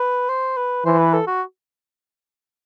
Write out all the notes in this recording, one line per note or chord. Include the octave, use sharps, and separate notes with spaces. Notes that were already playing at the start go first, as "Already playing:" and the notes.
Already playing: B4
C5
B4
E3 C5
B4
A4
F#4